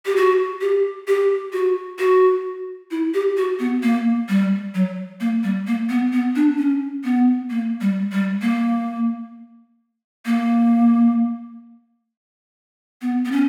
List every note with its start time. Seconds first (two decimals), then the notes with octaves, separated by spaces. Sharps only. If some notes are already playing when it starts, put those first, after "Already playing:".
0.06 G4
0.16 F#4
0.61 G4
1.08 G4
1.53 F#4
1.99 F#4
2.91 E4
3.14 G4
3.37 F#4
3.59 B3
3.83 A#3
4.29 G3
4.75 F#3
5.20 A#3
5.43 G3
5.67 A#3
5.89 B3
6.13 B3
6.36 D4
6.58 C#4
7.04 B3
7.50 A#3
7.81 G3
8.12 G3
8.42 A#3
10.26 A#3
13.02 B3
13.25 B3
13.32 C#4